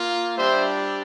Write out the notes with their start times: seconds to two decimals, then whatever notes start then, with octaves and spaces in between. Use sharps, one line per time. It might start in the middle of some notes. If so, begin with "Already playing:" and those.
Already playing: A#3 F4
0.37 G3 D4 G4 C5 E5